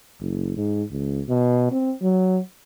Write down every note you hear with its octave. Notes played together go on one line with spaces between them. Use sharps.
F#1
G#2
C#2
B2
C4
F#3